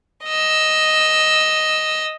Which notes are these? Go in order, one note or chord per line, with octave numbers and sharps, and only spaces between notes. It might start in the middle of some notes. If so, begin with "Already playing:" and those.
D#5 E6